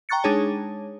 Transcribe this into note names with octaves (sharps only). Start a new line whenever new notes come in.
G5 A#5 C#6 F#6 A6 C#7
G#3 D4 D#4 G#4 C#5 A5